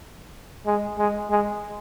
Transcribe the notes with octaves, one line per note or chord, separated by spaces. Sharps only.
G#3
G#3
G#3